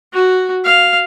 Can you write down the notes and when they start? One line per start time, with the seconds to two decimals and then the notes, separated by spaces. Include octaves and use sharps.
0.14 F#4
0.65 F5